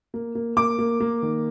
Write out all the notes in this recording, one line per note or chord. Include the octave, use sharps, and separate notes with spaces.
A#3
A#3
A#3 D6
A#3
A#3
D#3